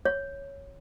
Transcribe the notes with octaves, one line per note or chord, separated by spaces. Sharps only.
C#5